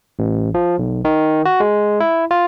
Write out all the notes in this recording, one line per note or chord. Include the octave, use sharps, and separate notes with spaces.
A1
F3
B1
D#3
F#4
G#3
E4
F4